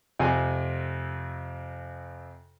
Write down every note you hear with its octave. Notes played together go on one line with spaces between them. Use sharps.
F2 C3 G#5